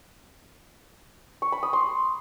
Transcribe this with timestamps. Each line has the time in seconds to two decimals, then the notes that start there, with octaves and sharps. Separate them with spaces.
1.42 C#6
1.52 B5
1.63 D#6
1.73 C6